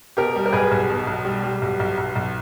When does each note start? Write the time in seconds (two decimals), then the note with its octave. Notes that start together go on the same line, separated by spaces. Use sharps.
0.17 B2 G4 A#4
0.36 G3
0.46 A#4
0.53 B1 G#4 B4
0.71 B1
0.90 B2
1.07 B1
1.25 G3
1.44 G3
1.62 B1
1.80 B1
1.97 B1
2.15 B1